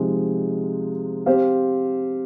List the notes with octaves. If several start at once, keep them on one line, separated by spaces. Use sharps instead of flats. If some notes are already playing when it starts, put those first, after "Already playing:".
Already playing: C3 F3 G#3 D#4
C4 G4 C5 F5